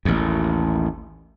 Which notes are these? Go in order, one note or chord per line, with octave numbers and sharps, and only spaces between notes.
A1 D#2